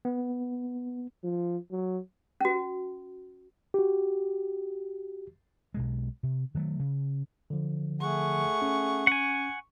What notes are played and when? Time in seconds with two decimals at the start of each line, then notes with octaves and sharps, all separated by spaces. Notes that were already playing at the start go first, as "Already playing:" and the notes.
0.05 B3
1.24 F3
1.71 F#3
2.41 C#4 F#4
3.74 F#4 G4
5.74 B1 B2 G#3
6.23 C3
6.55 D#3 F#3 G#3 A3
6.79 C#3
7.50 D3 F3
8.01 A3 G#4 F#5 C#6
8.62 C#4
9.07 F#5 G#5